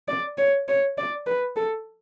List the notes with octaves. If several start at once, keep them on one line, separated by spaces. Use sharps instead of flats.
D5
C#5
C#5
D5
B4
A4